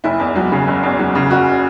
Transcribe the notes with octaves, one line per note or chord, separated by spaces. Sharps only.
F#1 E4
E2
F#3
C#3
F#1
E2
F#3
C#3
F#1 F#4